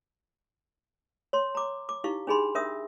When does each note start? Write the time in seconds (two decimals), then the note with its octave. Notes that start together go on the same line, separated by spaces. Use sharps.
1.33 C#5 C6
1.55 A#5 D6
1.89 D6
2.04 D#4 E4 G4 F5 C#6
2.27 D4 D#4 G#4 G#5 B5 C6
2.55 D4 A#4 E5 D#6